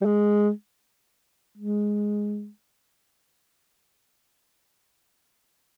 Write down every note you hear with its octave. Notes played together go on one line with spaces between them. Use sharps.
G3
G#3
G#3